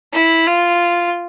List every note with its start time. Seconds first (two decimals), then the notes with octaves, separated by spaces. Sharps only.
0.13 E4
0.47 F4